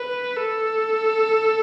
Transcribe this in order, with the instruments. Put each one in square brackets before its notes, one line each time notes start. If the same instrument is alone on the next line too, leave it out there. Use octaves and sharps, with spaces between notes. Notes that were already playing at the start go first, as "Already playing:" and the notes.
Already playing: [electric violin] B4
A4